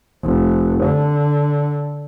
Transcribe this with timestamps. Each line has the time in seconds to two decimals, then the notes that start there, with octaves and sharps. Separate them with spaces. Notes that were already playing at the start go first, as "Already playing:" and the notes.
0.24 F1
0.83 D3